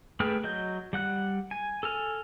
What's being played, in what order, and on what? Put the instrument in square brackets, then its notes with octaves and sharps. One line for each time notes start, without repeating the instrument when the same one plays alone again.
[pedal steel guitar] A3 G#4 B4 G5 F6
F#3 D#5 G6
G3 F#5 F#6
G#5
A4 G#5 F6